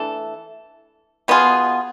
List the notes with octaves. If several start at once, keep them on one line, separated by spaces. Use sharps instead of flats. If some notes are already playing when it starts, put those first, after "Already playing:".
Already playing: E3 A3 D4 A4
B2 B3 F4 G#4